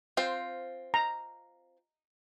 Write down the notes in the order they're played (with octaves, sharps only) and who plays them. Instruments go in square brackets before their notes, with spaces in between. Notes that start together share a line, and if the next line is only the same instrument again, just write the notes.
[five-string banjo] C4 F4 C5
[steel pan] A#5